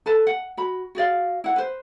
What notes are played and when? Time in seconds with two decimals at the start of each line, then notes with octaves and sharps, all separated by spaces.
0.06 A4 B4 A5
0.27 F#5
0.57 F#4 B5
0.95 F#4 G#4 D5 F5
1.44 E4 F#5
1.56 B4 C5